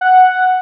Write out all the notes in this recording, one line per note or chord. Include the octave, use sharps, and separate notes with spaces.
F#5